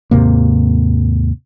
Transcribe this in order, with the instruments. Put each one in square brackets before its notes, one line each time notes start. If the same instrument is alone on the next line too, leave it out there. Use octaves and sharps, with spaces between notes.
[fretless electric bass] D#2 G#2 C3 A#3